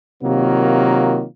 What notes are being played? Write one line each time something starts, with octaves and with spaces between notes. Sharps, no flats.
C3 D#3 F#3 A#3 F4